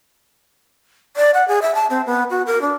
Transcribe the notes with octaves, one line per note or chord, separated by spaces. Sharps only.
D5
F#5
G#4
E5
A5
C4
B3
F#4
A#4
D4